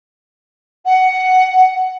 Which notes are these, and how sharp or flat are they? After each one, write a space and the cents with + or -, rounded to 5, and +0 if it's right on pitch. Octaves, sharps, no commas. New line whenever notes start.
F#5 +10